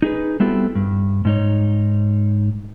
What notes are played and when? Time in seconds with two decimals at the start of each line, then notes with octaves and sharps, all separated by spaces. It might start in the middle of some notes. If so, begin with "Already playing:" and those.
0.02 D#4 G#4 B4
0.40 G3 B3 C4 E4 F#4 A4
0.75 G2
1.25 G#2 D#4 C#5